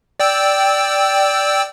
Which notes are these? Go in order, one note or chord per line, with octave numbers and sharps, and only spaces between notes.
D5 G5 E6